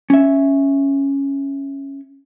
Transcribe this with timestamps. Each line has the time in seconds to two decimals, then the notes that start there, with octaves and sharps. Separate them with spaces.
0.10 C#4 E5